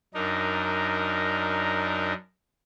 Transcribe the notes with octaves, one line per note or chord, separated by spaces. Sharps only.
F#2 D4 D#4 A#4